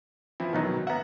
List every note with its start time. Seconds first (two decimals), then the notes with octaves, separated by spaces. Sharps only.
0.40 E3 F3 C4 E4
0.53 B1 D#3 F#3 B3 D#4
0.87 B3 E5 F#5 A#5